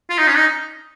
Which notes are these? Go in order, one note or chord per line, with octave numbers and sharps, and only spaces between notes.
F4
D#4
C#4
D#4